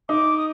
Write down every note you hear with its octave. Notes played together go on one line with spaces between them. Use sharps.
D#4 D6
D#6